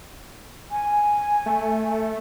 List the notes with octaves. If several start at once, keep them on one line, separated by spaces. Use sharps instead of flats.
G#5
A3